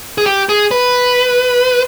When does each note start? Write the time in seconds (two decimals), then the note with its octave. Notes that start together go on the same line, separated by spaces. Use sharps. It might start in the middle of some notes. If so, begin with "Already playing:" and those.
0.18 G#4
0.26 G4
0.49 G#4
0.71 B4